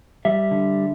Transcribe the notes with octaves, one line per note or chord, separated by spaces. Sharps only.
G3 E5
D3